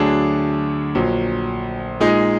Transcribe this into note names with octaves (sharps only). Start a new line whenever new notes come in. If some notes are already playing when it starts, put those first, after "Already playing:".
Already playing: D2 D3 F#3 D4 G#4
A#1 A#2 F#3
A#2 G#3 D#4 G#4